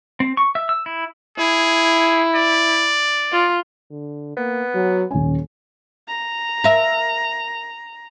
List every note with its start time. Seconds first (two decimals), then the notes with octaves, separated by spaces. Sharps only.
0.20 C4
0.37 C#6
0.55 E5
0.69 E6
0.86 E4
1.38 E4 G#4
2.36 D5
3.32 F4
3.91 D3
4.37 A#3 B3
4.75 F#3
5.11 D#1 C#4 G#5
6.08 A#5
6.64 A#4 E5